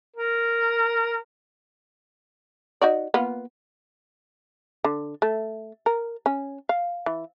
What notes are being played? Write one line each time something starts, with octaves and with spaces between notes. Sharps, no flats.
A#4
D#4 F#4 D5
A#3 B3 F4
D3
A3
A#4
C#4
F5
E3